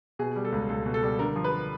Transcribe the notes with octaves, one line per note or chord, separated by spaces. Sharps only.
B2 G#4
G3
A4
C#2
C#2 A4
B2
A4
G3
D3 A#4
F3
B4